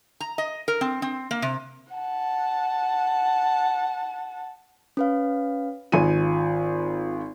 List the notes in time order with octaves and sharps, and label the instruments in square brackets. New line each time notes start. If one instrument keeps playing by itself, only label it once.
[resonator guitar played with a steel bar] A#5
D#5
A#4
C4
C4
A#3
C3
[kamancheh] F#5 A5
[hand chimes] C#4 B4 F5
[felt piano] G#1 G#5 D#7 [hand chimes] F4